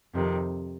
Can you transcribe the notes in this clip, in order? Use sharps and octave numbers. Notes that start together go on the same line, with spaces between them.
F2 C3 D#3